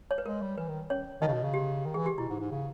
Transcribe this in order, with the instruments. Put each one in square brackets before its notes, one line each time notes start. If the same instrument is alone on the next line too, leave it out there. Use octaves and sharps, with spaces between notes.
[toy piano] C#5
B4
[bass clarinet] G#3 [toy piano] A#4
[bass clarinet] G3
[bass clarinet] E3 [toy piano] B4
[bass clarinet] D#3
[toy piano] C#4 C#5
[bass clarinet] D#3 [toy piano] D#4 D#5
[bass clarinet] C#3
B2
C#3
[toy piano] G4
[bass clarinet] D#3
[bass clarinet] E3 [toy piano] G#4
[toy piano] G4
[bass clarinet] B2 [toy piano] E4
[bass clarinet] G#2
G#2
C#3